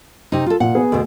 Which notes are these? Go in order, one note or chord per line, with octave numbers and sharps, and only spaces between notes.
C3 D#4
F4 A4
A#2 F#5
B3 G#4
D2 B2